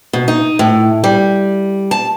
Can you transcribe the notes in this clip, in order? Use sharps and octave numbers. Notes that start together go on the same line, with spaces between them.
B2
D#4
A2
G3
A5